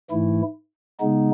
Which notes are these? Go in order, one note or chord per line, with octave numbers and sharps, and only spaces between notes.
G#2 E3 A3 E4
C#3 G#3 B3 D#4